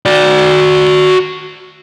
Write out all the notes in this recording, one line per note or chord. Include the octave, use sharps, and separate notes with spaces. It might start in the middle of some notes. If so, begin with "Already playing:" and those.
F#4 D5